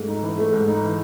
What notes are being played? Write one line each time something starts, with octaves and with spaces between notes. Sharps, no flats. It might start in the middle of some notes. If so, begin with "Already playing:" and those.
Already playing: G#2 A3
D#4
E3
A3
G#2
D#4
E3